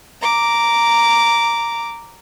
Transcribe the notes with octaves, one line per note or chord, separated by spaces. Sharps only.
A#5 D6